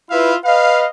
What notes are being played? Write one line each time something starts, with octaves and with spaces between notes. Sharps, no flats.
E4 F4 B4 E5 F5
B4 D#5 F5